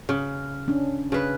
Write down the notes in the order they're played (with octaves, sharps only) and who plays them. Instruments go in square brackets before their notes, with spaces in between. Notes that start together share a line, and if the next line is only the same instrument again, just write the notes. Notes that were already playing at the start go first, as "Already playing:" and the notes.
[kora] C#3
[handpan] C#4 D4
[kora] C#3 B4